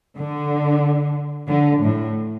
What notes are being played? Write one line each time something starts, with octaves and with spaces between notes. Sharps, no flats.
D3
D3
A2